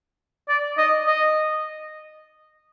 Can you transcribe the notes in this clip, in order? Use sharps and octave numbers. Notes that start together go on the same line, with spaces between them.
D5
D#5
D#5